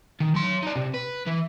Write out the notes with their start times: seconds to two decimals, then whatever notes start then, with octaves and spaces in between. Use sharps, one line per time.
0.20 D#3
0.35 F#3 C6
0.63 D#4 D5
0.76 C3
0.94 B4
1.27 E3